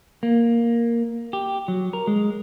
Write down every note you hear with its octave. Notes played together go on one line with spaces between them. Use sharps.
A#3
G4
F#3
A#4
G#3